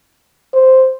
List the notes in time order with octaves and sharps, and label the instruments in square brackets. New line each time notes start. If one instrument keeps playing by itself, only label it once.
[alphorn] C5